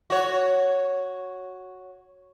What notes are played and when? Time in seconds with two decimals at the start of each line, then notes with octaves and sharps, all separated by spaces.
0.10 F#4 C#5